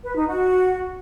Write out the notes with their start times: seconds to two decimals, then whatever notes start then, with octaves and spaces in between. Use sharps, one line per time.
0.03 B4
0.15 D#4
0.27 F#4